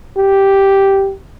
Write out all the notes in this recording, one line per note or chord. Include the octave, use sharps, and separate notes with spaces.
G4